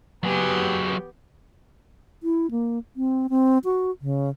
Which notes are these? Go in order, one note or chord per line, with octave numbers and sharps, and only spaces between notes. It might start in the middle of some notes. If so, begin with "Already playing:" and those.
F#3 B3 G4 G#4
E4
A#3
C4
C4
F#4
C#3